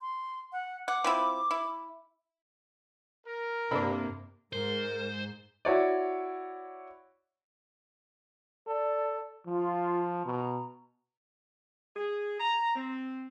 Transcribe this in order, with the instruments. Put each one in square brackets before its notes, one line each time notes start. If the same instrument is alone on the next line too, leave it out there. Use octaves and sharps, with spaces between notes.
[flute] C6
F#5
[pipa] F#5 [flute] D6
[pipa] F3 C4 E4
E4
[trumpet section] A#4
[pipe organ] G2 [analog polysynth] C3 A#3 [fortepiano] D4 A4 B5
[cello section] G#2 [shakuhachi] A#4 [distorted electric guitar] C5
[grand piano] E4 F#4 C#5 D5
[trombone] A4 [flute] D5
[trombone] F3 [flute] F4
[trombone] B2 [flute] A#5
[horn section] G#4
A#5
C4